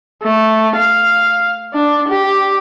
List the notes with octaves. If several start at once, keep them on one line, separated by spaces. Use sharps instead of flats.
A3
F5
D4
G4